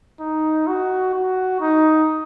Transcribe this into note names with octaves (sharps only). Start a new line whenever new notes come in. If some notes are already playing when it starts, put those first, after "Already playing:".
D#4
F#4
F#4
D#4